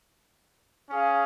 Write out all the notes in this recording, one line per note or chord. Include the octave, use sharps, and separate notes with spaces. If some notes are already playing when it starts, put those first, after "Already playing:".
C#4 G#4 F5